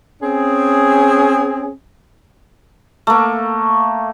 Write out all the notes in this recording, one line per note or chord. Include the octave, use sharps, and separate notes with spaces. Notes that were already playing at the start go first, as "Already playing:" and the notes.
C4 C#4 G#4
A3 A#3